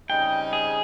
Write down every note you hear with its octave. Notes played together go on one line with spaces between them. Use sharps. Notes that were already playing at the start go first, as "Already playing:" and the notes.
C#3 G3 C4 D#4 G5
G#4